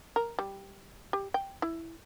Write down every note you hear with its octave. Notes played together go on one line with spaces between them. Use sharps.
A#4
G3
G4
G5
E4